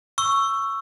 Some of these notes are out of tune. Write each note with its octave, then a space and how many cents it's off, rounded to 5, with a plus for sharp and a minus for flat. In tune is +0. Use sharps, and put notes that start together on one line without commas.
C#6 +0 E6 +15